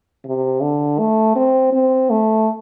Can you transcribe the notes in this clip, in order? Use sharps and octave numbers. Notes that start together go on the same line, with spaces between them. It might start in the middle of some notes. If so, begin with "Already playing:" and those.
C3
D3
A3
C4
C4
A3